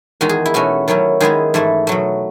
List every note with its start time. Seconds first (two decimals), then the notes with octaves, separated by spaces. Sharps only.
0.21 E2 D#3 G#3 D#4 F#4
0.29 G#4
0.46 E4
0.54 B2 A3 C#4 F#4
0.88 D#3 F#3 C#4 E4
1.20 D#3 G#3 B3 E4 G#4
1.54 G#2 E3 A3 E4
1.87 B2 F#3 A3